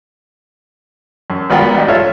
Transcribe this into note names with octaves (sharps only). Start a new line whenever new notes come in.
F#2
G#1 B3 F4 A#4 F#5 G5
A1 D4 D#5
F4 A4 C#5 E5